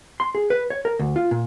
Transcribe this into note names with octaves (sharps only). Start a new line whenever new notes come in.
C6
G#4
B4
C#5
A#4
D2
F4
A#2